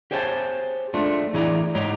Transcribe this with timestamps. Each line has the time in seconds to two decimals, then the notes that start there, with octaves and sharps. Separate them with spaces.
0.11 G4 G#4 C5 C#5 F#5 A5
0.94 G#3 A3 D4 F4
1.33 A2 E3 E4 G#4 D5 A#5
1.75 G#2 G#3 G4 C#5 A#5